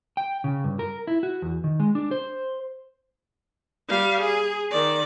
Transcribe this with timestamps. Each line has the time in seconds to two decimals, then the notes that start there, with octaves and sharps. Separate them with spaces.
0.17 G5
0.44 C#3
0.64 G2
0.79 A#4
1.07 E4
1.23 F#4
1.42 E2
1.64 D#3
1.80 G#3
1.95 D4
2.11 C5
3.89 G3 F5
4.20 G#4
4.71 D#3 D5